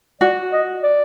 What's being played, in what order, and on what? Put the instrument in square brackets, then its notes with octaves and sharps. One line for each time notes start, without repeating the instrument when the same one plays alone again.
[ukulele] F#4 [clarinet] D5
[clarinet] D#5
D5